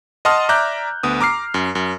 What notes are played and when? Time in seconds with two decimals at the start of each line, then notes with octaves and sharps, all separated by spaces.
0.25 D#5 F#5 A5 C6 D#6 F6
0.49 D5 E5 A#5 D6 F#6 G6
1.03 D2 B3 D#6
1.20 A#5 D6 F6 C7
1.54 F#2
1.75 F#2